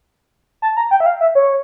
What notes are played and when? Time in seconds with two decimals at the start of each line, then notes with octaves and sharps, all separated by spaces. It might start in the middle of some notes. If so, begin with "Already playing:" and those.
0.62 A5
0.77 A#5
0.91 G5
1.00 E5
1.06 F5
1.21 E5
1.35 C#5